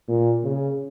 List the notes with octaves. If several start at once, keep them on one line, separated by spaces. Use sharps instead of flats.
A#2
C#3